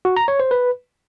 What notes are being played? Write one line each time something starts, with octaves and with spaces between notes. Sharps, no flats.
F#4
A#5
C#5
C5
B4